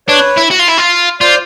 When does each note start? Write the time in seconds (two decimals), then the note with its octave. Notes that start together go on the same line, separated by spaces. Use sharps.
0.09 D4 B4 C#5
0.38 E4
0.51 F#4
0.60 F4
0.69 E4
0.78 F4
1.21 F4 C5 D5